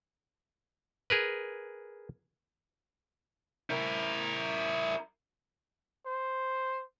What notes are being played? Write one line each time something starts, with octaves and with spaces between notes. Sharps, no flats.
G#4 A#4 B4
E4 A#4
C5